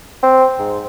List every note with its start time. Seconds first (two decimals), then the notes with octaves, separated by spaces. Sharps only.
0.23 C4
0.59 G#2